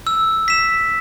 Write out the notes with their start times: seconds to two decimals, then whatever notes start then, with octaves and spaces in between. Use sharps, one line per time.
0.07 E6
0.48 B6 E7